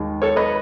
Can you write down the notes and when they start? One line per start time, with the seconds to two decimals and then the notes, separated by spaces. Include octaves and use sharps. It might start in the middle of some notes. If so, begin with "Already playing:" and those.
Already playing: D#2 D#3 G#3
0.22 A4 C#5
0.36 B4 D#5